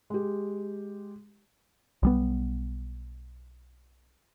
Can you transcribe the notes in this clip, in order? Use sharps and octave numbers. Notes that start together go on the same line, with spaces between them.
G#3 G4
B1 G3 B3